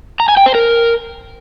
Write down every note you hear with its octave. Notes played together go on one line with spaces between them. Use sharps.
A#5
G#5
G5
C5
A#4